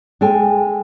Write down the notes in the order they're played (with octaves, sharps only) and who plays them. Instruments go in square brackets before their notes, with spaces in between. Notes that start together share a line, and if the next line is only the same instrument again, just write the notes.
[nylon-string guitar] G#3 A4 G5 G#5